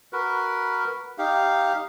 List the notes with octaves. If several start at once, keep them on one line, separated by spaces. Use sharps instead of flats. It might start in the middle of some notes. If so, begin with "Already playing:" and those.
F#4 A#4 B4
D#4 G4 F5